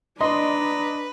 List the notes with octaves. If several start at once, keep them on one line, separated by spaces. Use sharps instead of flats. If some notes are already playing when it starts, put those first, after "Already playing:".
D4 B4 D5 D#5 A#5 C6